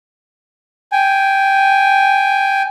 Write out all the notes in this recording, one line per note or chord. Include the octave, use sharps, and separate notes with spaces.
G5 G#5